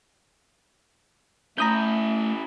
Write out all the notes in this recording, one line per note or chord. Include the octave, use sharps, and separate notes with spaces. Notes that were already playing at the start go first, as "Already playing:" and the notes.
A3 C#4 E4 A#5 D#6 G6